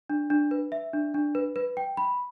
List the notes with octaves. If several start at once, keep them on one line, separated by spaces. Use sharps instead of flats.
D4
D4
B4
E5
D4
D4
B4
B4
G5
B5